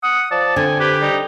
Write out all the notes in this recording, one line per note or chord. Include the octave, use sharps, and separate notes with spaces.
F#5 D#6
F3 D5 A5
D3 C4 G#5
G4 B4
G3 D#4